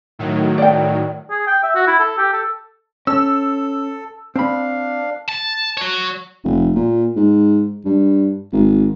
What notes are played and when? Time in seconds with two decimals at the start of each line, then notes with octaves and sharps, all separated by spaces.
0.19 A2 D#3 F#3
0.58 D5 G5
1.31 G#4
1.47 G5
1.63 E5
1.75 F#4
1.87 E4
2.00 A4
2.18 G4
2.33 A4
3.07 C#4 A4 E6
4.36 C4 D4 F5 B5
5.28 A5
5.77 F#4 C#5
6.44 F1
6.75 A#2
7.16 G#2
7.85 G2
8.53 G#1